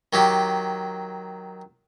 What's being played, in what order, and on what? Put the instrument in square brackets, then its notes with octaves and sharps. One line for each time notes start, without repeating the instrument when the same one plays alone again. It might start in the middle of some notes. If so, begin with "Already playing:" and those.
[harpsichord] D#3 F#3 G4